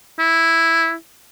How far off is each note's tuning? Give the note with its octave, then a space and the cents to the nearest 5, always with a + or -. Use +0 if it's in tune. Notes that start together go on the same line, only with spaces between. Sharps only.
E4 +0